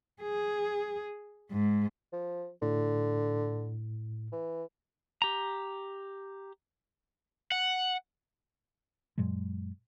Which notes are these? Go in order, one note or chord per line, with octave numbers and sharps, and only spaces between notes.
G#4
G#2
F3
A2 D3
E3
G4 A#5
F#5
F#2 A#2 F#3 G#3